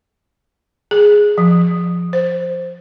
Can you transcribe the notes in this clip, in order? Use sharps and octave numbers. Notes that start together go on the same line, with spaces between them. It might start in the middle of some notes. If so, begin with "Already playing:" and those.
G#4
F3
C5